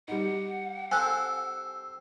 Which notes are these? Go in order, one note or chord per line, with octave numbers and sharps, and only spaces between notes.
G3 D#4 F#5
C4 A4 G#5 F#6